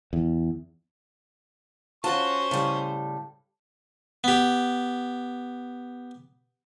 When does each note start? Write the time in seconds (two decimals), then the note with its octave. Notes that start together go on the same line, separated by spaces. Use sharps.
0.13 E2
2.04 C#4 F4 F#4 C5 A5 C#6
2.51 A2 C#3 G3
4.24 B3 G4